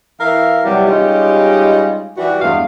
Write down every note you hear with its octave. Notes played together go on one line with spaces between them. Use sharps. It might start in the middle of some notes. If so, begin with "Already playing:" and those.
E3 A#4 E5 F5
C3 E3 F#3 G3
G3 G#3 C#4 D#4 F4 G4
E3 G3 F#4
E2 G2 G#3 A3 F5